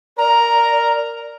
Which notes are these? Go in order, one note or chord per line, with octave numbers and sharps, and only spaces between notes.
A#4 D5 A#5